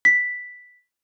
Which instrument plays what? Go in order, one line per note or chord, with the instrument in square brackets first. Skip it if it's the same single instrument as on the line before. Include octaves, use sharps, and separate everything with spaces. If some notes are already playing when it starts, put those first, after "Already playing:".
[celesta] B6